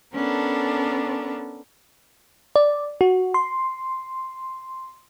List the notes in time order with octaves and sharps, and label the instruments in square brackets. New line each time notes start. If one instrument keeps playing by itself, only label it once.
[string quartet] B3 C#4 D4 A4 A#4
[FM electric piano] D5
F#4
C6